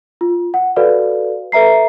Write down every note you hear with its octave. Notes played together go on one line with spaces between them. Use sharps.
F4
F#5
F#4 A4 B4 D5 F5
A4 B4 E5 A#5 C7